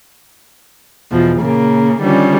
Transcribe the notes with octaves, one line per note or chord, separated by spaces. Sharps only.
E2 B2 F3
A#2 C#3 A#3
D3 D#3 F3 G3 C#4